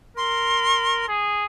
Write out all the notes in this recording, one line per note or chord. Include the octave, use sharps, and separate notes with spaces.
A#4 C6
G#4